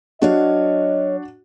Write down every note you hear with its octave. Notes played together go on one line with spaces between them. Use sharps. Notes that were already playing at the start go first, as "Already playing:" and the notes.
F#3 D4 F#4 C#5 D#5 F5